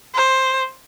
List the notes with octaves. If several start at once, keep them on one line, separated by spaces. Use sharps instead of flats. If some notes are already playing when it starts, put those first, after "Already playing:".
C5